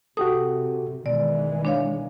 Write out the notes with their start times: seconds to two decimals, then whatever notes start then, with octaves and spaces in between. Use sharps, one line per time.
0.17 C3 F#4 G4 A4 D#6
1.06 B2 D#3 E3 G#3 D5
1.65 D4 C#5 F5